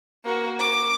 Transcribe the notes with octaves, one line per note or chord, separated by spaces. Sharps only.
A#3 F#4
D6